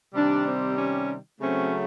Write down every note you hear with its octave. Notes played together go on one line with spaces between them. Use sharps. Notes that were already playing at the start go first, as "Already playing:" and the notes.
C3 D#3 G3 D4
C4
C#4
C#3 F#3 A3 C4 C#4